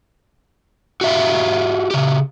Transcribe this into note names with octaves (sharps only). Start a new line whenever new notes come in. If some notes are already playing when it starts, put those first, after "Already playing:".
F#4 G4 E5 F5
C#3 G4